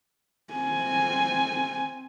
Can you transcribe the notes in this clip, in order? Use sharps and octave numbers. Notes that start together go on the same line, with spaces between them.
C4 G#5